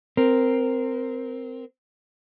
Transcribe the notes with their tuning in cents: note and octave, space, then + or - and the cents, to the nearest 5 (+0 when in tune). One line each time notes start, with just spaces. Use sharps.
C4 -10 A#4 +0